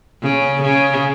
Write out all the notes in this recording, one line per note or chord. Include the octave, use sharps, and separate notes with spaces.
C#3
C#3